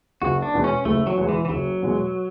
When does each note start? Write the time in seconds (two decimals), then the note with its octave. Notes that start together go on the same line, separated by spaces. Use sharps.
0.22 F#1 F#4
0.42 D4
0.54 E2 B2 G#3
0.64 C#4
0.85 F#1 A3
1.07 F#3
1.17 E2 B2 G#3
1.29 E3
1.45 E3
1.49 F#1 F#3
1.82 E2 B2 G#3